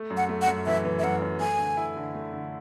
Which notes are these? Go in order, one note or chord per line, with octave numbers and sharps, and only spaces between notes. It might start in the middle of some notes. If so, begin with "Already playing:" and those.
Already playing: A3
F#2
F#5
A3
F#5
F#2
E3 E5
E3
E5
F#2 F#5
F#2
A3 G#5
D3
E4
D3
A3
D3